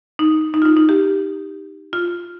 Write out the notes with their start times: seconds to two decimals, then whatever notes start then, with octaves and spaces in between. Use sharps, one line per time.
0.19 D#4
0.54 D#4
0.62 F4
0.65 D#4
0.77 D#4
0.89 G4
1.93 F4